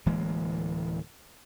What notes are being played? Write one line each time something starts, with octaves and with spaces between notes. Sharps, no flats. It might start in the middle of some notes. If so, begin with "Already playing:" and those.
D1 E3 G#3 A#3